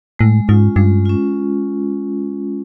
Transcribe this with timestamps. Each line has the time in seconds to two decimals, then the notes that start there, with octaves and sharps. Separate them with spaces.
0.19 A2 G#3
0.48 G#2 C#4 F4
0.76 G2 G#3
1.05 C#4 F4